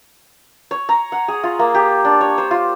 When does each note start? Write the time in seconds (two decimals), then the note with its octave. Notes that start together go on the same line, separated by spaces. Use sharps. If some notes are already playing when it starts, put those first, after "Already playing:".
0.71 C#5
0.89 A#5
1.12 F#5
1.28 G#4
1.43 F4
1.59 A#3
1.75 G4
2.05 D4
2.20 C#5
2.38 C5
2.51 F4